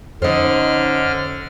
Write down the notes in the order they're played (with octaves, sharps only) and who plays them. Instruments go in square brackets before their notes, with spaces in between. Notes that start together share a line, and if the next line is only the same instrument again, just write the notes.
[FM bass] F2 [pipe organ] D3 F6 [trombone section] C#4 D#4 [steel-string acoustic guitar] C5 D#5